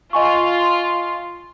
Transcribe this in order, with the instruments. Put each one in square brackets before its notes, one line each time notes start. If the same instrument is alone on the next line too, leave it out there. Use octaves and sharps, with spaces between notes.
[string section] F4 [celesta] D#5 G#5 C#6